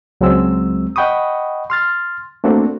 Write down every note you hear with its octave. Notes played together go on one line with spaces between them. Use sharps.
C#2 F#3 G#3 C4 E6
D#5 F#5 G5 B5 C#6 D#6
C6 F6 A6
A3 A#3 C4 D4 F#4 A4